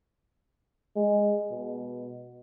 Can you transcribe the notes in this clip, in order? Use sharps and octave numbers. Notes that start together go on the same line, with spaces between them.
G#3
B2